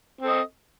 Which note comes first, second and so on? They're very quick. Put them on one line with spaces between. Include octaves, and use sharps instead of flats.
C4 A4 D#5